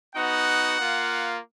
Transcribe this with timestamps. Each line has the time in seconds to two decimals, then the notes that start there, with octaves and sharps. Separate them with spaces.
0.15 B3 D#4 F#4 F#5
0.78 A#3 F4